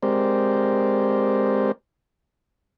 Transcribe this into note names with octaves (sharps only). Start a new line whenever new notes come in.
G#3 C4 G4 A#4 C5 D5